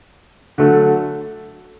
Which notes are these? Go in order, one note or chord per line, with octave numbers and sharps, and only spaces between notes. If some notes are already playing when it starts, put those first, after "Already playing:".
D3 F#3 A3